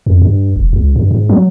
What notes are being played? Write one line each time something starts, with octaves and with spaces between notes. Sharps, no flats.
F2
G2
E1
C#2
G2
G#2
F#3